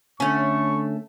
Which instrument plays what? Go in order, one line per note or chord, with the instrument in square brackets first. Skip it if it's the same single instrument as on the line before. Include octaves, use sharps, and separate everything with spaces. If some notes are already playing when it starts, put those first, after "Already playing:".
[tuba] D3 [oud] A3 C#4 [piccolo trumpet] C#6